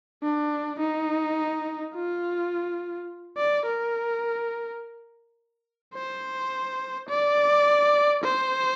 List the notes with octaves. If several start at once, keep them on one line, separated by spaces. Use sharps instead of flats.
D4
D#4
F4
D5
A#4
C5
D5
C5